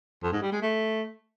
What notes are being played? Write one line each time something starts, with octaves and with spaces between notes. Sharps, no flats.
F2
G#2
G3
G#3
A3